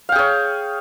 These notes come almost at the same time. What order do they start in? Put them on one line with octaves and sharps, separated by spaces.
F5 G5 G#4 C#5